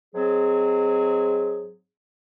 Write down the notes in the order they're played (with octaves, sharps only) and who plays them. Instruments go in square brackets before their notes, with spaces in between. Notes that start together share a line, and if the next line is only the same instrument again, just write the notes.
[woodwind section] G#2 F#3 C4 G#4